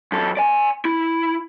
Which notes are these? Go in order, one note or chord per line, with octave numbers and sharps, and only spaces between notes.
F#2 A4
D5 G#5
E4